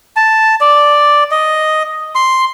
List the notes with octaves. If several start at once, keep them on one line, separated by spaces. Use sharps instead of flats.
A5
D5
D#5
C6